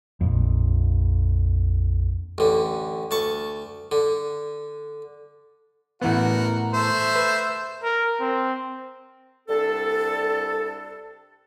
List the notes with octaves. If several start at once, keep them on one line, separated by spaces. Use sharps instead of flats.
A#1 F2
A1 D3
D2 A5 C#6
D3
A2 E3 B3 F#4 A#4
A3 C5 E5
B4
A#4
C4
C2 G3 D4 A4